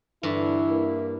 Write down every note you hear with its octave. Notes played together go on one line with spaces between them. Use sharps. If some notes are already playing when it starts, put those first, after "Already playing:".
G2 D3 E3 E4
A#3